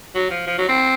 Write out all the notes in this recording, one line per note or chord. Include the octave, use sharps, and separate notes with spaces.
F#3
F3
F3
F#3
C4